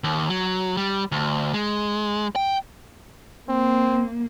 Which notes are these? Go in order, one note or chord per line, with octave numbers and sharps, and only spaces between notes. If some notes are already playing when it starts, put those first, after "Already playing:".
D#2
F#3
G3
D2
G#3
G5
A#3 C4